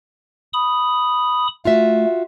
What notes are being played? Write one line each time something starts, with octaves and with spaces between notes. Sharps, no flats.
B5 D#6
A3 F4 F#4 E5